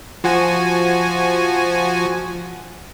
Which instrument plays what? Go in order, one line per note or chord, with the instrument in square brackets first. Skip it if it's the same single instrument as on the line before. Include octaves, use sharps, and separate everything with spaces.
[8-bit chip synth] F3 F#4 G#5